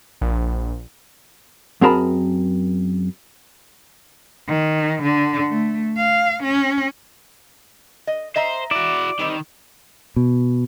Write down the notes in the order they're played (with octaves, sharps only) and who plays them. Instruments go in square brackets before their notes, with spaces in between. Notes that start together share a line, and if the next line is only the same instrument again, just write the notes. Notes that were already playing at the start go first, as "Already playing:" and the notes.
[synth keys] A#1
[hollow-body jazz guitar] F#2 C4 G#4 A#4 A5 B5
[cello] D#3
D3
A3
F5
C#4
[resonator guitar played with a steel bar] D#5
[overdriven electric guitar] C5 [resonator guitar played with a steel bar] D#5 E5 A#5
[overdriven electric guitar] E4 F#4 [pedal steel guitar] D5
[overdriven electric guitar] D#3 [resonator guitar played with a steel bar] G3 C4 D#4
[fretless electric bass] B2